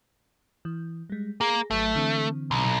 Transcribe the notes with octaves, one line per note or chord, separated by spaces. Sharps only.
E3
G3 G#3
A#3 G#4 A#5 A#6
G#1 F#3 A3
D3 E3 C4
B1